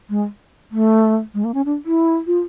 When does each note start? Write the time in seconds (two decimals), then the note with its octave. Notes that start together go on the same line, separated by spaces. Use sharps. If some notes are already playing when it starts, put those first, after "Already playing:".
0.09 G#3
0.71 A3
1.34 G#3
1.44 A#3
1.54 C#4
1.65 D4
1.86 E4
2.27 F4